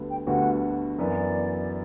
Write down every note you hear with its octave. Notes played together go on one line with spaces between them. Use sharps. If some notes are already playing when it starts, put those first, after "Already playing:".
Already playing: D2 D3 G3 B3
G5
D2 D3 G3 B3 F#4 F#5
F#2 E3 B3 D5